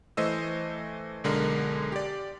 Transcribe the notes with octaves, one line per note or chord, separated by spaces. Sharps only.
E3 A3 C5 D#5 E6
B1 D3 G#3 A#4
G4 D5